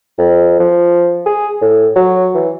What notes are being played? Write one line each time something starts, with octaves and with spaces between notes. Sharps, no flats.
F2
F3
G#4
A2
F#3
E3